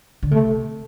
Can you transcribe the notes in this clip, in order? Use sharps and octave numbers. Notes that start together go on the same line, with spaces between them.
D3
C3 A3